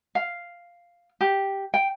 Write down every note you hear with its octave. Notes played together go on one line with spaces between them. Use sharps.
F5
G4
G5